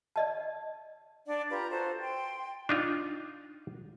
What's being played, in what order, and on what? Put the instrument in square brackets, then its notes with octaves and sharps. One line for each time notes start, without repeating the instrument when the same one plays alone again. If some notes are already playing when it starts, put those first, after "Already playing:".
[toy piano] D5 D#5 A5
[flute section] D4 D5 F#5
F4 G4 B4 A#5
F4 F#4 A4 C5
G5 C6
[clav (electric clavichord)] D4 D#4 F4